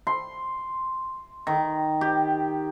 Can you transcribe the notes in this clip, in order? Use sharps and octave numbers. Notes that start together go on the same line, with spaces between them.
C6
D#3
G4